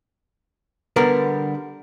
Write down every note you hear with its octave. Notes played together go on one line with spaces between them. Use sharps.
D3 G3 B3 A#4